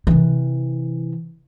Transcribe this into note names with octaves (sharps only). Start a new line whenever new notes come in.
C3 E3